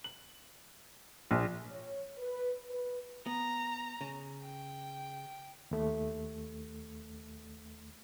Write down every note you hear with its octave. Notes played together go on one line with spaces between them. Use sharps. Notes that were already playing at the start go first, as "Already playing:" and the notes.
F#7
A#1
C#5
B4
B4
B3 A#5
C#3
G5
D#2 A3